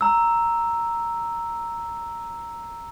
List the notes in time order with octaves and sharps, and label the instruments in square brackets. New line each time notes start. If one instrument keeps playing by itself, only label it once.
[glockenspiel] A#5 E6